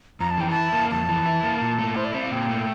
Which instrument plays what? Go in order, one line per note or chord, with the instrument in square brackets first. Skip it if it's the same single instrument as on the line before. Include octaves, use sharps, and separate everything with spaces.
[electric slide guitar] F2 [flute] A#5
[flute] A5
[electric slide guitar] E3 [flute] G5
[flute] A5
[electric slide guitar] E4
A#3
[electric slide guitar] F2 [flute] A5
[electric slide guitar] E3
E4
A#3
A#2
A3
[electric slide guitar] E4 [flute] C5
[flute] D5
[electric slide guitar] C4 [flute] E5
[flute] F5
[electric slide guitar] A#2 [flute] G5
[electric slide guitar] A3